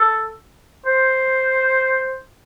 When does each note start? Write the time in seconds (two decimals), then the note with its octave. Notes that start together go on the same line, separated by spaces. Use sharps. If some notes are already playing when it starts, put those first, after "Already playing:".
Already playing: A4
0.86 C5